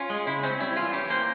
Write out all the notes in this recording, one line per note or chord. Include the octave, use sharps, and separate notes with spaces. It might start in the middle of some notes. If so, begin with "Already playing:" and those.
Already playing: C#4 F4
G#3
C#3 E4
C4 C#4
G3 E4
E3 F4
F4
C#4 G4
A#3 C5